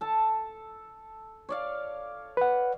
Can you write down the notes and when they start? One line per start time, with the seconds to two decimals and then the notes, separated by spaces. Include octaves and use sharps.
0.01 A4 A5
1.49 C#5 D5 F5
2.37 B4 F#5